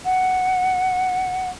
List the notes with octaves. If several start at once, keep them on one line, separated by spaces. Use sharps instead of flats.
F#5